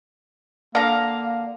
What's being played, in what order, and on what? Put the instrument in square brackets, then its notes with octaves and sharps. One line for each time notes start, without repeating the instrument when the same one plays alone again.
[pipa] D3 [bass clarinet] A#3 [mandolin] F5 A#5